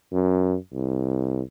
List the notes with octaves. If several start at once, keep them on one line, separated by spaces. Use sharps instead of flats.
F#2
C2